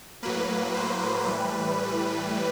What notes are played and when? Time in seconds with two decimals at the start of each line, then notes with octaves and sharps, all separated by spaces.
0.23 A2 F#3 A#3 B4
0.74 C5
1.26 A2 E3 G3 B4